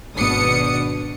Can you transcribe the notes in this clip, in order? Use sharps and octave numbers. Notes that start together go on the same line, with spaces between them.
G#1 B2 D4 D#6 C#7